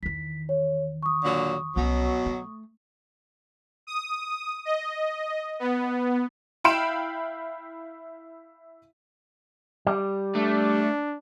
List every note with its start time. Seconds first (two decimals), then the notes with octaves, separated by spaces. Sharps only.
0.03 E2 D#3 B6
0.49 C#5
1.03 C#6 D#6
1.24 A#2 D3 F#3
1.76 C2 B2 F#3 C#4
2.26 A3
3.87 D#6
4.65 D#5
5.60 B3
6.64 E4 F5 G5 B5 D7 E7
9.87 G3
10.36 A3 D4